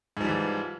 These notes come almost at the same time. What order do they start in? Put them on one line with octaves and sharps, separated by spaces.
G#2 F3 G3 E3